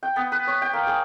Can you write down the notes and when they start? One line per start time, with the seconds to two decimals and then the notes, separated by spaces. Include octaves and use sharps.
0.03 G5
0.16 B3
0.32 B4
0.47 C#5
0.62 G5
0.73 A#3
0.87 G#4